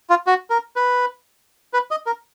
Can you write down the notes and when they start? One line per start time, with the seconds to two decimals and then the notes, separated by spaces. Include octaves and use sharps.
0.10 F4
0.27 F#4
0.50 A#4
0.76 B4
1.73 B4
1.91 D#5
2.06 A#4